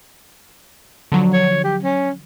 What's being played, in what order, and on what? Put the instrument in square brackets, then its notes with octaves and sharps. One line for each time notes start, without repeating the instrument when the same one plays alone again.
[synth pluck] D3 F3 F#3
[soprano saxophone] C#5
G4
C#4